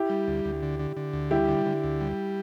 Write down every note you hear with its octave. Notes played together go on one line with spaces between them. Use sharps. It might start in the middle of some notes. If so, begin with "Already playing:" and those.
Already playing: E4 G4
G3
D2
D2
D3
D3
D3
D2
G3 E4 G4
D3
D3
D2
G3